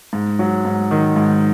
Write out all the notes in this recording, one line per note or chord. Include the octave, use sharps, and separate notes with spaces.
G#2
F#3
G#2
D#3
G#2